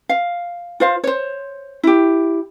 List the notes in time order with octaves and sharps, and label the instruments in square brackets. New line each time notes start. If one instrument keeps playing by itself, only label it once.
[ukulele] F5
F4 C5 F5
C5 C#5
E4 G4